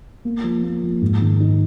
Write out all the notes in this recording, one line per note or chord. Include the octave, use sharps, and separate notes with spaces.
A#3
F3
A#3
F3
G#2
D#3
D#4